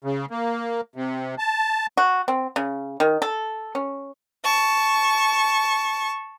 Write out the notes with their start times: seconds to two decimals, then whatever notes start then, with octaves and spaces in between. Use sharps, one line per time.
0.04 C#3
0.30 A#3
0.96 C3
1.38 A5
1.97 F#4
2.28 C4
2.56 C#3
3.00 D#3
3.22 A4
3.75 C#4
4.44 A5 C#6